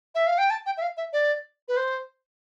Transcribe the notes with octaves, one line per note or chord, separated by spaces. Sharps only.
E5
F5
G5
A5
G5
E5
F5
E5
D5
B4
C5